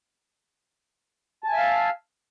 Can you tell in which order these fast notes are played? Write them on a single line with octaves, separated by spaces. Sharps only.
A5 G#5 E5 F5